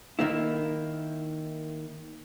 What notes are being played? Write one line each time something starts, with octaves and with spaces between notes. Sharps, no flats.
D#3 A#3 E4